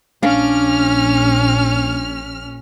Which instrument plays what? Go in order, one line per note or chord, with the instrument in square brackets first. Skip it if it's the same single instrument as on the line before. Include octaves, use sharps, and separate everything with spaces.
[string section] A#1 F6 [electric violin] C#4 [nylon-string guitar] D4 F5